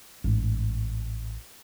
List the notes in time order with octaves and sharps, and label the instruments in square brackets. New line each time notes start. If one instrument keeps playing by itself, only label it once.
[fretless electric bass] A1 G#2